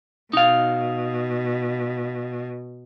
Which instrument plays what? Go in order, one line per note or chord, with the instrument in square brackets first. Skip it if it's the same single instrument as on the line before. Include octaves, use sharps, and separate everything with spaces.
[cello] B2 [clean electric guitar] D#4 F5